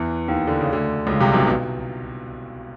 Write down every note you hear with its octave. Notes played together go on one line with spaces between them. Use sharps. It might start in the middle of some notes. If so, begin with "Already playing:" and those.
Already playing: E2 E3
D#2 D#3
D3
C#3
D2 D3
C#2 C#3
C2 C3
B1 B2
B2